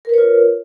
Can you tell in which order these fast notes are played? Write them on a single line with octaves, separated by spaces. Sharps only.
A#4 B4 C#5 F4